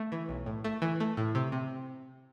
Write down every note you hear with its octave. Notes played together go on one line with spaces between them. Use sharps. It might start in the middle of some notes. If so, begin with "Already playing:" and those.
Already playing: A3
E3
B1
A2
A3
E3
A3
A2
C3
C3